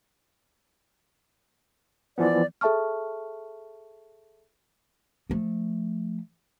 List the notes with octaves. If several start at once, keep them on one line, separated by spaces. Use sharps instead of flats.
E3 F3 B3 D5
G#4 A4 E5 A5 C#6 F6
F3 A3